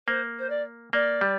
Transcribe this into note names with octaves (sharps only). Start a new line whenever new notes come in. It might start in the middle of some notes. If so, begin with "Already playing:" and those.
A#3 C5
C5
D5
A#3 D5
G3